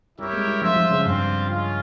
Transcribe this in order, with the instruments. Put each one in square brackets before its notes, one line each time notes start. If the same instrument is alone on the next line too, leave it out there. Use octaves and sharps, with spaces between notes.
[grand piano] G3 [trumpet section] E4 G4 A#4 C#5 E5
[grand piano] G#3
G3
[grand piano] F3 [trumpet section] F4 C5 E5
[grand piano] F3
C#3
[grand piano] G2 [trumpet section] G3 C4 F4
[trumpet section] G#3 C#4 F4